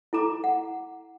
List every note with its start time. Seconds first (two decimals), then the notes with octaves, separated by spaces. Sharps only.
0.13 E4 A4 A#5 D6
0.44 F#5